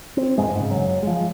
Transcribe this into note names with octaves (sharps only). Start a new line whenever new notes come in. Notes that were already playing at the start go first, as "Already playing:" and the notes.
C4
E2 G2 A#2 G#3
G#2 C#3
F#1 F#3
F3 G#3